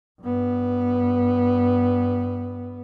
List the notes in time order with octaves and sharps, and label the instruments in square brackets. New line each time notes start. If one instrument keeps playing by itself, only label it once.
[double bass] G2 B3